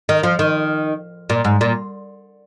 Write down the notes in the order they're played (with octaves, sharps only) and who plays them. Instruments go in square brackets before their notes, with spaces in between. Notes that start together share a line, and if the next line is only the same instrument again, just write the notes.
[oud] D#3
F3
D#3
A#2
G#2
A#2